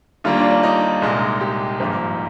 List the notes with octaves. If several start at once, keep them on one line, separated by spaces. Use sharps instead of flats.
D#2 D3 G3 A#3 F4
D4
D4
D#4
C2 A#2 G#3
G4
G#1 G2 F3 A#3